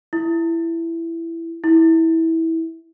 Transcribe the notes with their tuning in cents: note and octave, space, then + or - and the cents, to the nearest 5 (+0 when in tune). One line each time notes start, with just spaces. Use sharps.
E4 +10
E4 -20